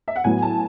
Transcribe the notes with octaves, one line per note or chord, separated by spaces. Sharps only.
E5
F#5
A2 F#3 B3 G#5
A5